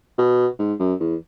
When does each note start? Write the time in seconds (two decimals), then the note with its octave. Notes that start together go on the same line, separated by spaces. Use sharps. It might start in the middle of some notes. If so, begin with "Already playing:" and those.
0.18 B2
0.59 G#2
0.80 F#2
1.00 E2